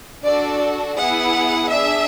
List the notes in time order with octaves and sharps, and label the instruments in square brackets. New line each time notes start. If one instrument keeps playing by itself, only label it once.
[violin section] D4 F#4 A4 D5
B3 E4 G#4 F#5
D4 G#4 E5